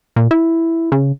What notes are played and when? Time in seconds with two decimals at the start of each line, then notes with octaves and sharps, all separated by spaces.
0.16 A#2
0.31 E4
0.92 C#3